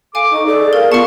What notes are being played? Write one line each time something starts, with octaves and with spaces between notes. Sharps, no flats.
A4 F5 G#5 D6
D#4 D#5 C#6
G#4 A4 D5
A#4 F5
B3 F4 F5 A5 C#6